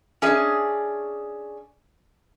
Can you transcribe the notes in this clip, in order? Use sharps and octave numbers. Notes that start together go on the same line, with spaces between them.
C#4 D4 G#4 D#5 E5